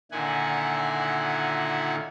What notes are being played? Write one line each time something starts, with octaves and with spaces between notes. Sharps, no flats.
A#2 D3 D#3 E4 F#5 G#5